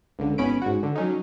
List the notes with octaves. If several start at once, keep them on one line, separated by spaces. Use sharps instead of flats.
C#2 D3
G#1 B3 C#4 B5 D7
G#2 F#4
D3
F#3 C#4 D#4